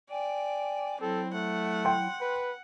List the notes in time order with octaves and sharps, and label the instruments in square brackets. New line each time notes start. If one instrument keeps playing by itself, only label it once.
[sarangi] D5 [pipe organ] G5 G#5
[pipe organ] F#3 E4 [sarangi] C4 [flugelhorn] A4
[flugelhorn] A3 [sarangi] F#5
[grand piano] G5 C6
[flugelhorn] B4